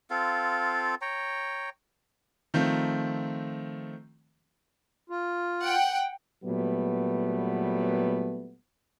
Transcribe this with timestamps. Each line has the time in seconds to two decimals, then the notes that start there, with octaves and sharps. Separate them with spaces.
0.10 C4 F4 A4 F5
1.01 C#5 G5 A#5
2.54 D#3 F3 A3 C4
5.10 F4
5.63 F#5 G5
6.43 A#2 F#3 G3 A3 B3